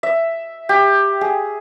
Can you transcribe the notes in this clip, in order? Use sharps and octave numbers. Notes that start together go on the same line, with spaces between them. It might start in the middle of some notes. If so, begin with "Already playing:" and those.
E5
G4
G#4